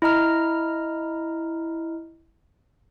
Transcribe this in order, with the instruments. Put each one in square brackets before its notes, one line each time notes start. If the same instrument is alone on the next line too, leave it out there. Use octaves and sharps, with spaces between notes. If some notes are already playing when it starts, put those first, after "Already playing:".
[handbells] E4 D#5 A#5 F6